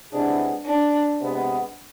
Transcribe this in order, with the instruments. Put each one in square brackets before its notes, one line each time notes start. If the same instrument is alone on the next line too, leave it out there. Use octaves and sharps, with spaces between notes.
[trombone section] C3 G#3 B3 E4 G#4 [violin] D4
[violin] D4
[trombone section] C3 G#3 B3